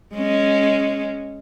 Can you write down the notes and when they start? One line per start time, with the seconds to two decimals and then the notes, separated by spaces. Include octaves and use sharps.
0.13 G#3 C#4